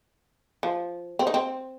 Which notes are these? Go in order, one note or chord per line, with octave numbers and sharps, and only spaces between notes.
F3
C4
D#4
C4